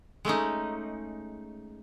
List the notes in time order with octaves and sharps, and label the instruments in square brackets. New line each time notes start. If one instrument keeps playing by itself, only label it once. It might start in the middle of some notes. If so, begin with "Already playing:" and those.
[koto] G#3 A3 C#4 D#4